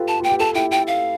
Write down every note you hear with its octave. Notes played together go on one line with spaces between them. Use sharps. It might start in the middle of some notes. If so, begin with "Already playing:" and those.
Already playing: F4 G4 A4 B4
A5
F4 G5
G4
F4 A4 A5
E4 G4 G5
G5
F5